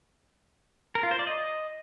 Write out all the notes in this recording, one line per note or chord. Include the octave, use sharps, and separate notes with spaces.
A#4
F4
C5
D5
D#5